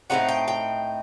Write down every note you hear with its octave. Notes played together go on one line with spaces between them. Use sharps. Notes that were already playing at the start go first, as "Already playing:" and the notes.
A2 F#3 C4 D#4 F#5
G5
G5